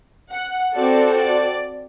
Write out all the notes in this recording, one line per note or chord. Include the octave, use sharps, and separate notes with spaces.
F#5
C4 F#4 A4 D5
D5